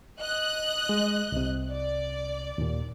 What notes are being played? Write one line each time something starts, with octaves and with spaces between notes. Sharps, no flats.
D#5 F#6
G#3
C2 C3
D5
D#2 A#2